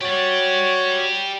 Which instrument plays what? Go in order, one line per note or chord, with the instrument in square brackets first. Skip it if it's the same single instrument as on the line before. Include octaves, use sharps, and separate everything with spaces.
[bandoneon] F#4 C#5 [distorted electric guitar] G4 D5